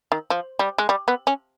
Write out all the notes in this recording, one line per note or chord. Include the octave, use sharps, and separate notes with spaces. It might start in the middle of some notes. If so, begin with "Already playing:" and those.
D#3
F3
G3
G#3
G3
B3
C#4